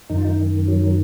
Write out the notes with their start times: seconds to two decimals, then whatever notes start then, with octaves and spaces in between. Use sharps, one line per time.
0.09 F#2 D#3 D#4
0.17 F4
0.25 D#4
0.68 F#3